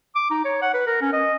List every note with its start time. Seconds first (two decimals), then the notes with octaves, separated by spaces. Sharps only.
0.15 D6
0.31 D#4
0.45 C#5
0.62 F#5
0.74 B4
0.87 A#4
1.01 C#4
1.13 D#5